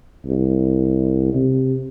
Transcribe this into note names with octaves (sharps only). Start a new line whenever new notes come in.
C2
C3